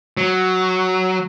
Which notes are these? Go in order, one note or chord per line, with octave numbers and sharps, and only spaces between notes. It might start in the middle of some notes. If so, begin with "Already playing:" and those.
F#3